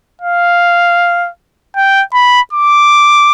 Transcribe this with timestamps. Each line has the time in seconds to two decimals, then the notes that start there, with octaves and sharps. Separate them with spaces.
0.22 F5
1.76 G5
2.14 B5
2.53 D6